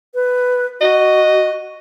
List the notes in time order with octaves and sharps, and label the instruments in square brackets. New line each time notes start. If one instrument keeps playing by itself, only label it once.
[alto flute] B4
[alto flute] F#4 [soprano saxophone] D#5